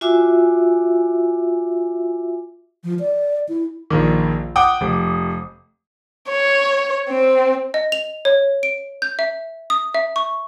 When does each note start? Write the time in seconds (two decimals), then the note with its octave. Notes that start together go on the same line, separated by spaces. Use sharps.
0.01 F4 F#4 E5 G#5 D6 E6
2.84 F3
2.99 D5
3.49 E4
3.90 A#1 D#3
4.56 F#5 G5 D6 D#6
4.81 F1
6.29 C#5
7.09 C4
7.74 D#5
7.92 F7
8.25 C#5
8.63 D7
9.02 G6
9.19 E5
9.70 D#6
9.94 E5
10.16 C#6